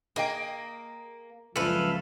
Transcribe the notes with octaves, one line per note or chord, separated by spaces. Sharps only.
A#3 G#4 D#5 G5
F#1 C#2 F3 C#4 A4 B4 E5 F5